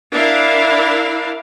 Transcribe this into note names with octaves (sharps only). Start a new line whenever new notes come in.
D4 E4 A#4 F5